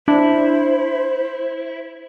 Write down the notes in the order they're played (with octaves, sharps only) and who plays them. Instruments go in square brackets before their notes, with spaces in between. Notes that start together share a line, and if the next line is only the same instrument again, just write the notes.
[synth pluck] D4 [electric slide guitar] E4 [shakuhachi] C5